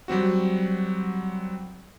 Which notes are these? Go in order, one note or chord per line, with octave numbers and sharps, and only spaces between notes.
F#3 G3 C4 F#4